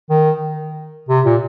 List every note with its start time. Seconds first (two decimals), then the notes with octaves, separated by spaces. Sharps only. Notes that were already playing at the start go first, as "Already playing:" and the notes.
0.10 D#3
1.09 C3
1.25 A#2